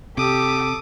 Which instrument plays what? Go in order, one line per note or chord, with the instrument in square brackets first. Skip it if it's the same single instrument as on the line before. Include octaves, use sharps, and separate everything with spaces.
[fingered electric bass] C3 [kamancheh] G4 [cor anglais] A4 [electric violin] D6 D#6